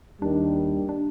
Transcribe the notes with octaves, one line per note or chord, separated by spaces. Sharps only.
D#2 D#3 G3 D4
D4